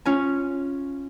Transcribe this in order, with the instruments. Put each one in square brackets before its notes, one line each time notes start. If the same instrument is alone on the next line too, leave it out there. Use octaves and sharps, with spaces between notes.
[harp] C#4 F4 G#5